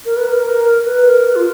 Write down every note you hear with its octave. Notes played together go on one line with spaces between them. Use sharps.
A#4
B4
A#4
A#4
B4
A#4
F4